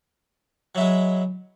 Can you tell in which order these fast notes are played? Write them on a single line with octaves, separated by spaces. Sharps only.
F#3 E4 G#3